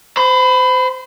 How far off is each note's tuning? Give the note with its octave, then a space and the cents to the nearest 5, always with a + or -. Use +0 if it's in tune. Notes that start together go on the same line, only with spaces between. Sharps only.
C5 -25 B5 +20